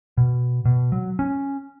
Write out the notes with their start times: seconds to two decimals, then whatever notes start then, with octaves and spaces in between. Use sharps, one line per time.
0.17 B2
0.65 B2
0.92 F#3
1.19 C#4